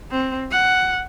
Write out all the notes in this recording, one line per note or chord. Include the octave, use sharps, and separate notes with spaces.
C4
F#5